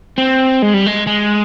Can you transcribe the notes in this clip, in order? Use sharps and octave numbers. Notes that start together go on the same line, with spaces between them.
C4
G#3
G3
G#3
G#3